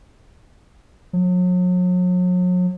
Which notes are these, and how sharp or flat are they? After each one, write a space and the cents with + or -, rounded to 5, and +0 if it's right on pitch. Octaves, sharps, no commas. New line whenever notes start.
F#3 -40